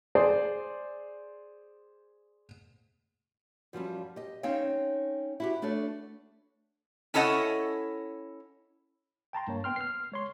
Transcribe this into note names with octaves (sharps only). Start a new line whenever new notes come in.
G#4 C5 D5
F#2 F3 G3 C#4
G4 D#5
C4 C#4 D#4 C#5 F5 G5
E4 F#4 G4
A3 D4 F#4 A4 C#5
C#4 E4 A4 C#5 D#5 F#5
G5 A5 A#5 C6
G2 A#3 C#5
B3 G5 C6 F6
F6 C7
G#3 C#5 C6